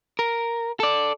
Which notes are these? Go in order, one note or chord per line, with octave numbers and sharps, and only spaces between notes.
A#4
A4 D5